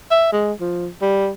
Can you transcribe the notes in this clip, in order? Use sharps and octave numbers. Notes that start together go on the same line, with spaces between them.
E5
G#3
F3
G3